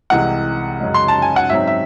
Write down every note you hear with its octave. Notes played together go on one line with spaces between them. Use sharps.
C2 C3 E3 G#3 F#5
F#2 C#3 G#3
C6
A5
G#5
F#5
G#2 F#3 C4 E5
E5